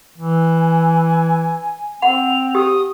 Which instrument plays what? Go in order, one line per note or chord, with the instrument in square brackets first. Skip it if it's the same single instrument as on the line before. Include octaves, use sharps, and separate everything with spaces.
[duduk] E3
[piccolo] G#5
[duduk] C4 [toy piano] F#5 [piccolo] F7
[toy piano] G4 [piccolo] D#6